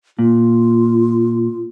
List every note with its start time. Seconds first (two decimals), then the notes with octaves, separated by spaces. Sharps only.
0.19 A#2 F4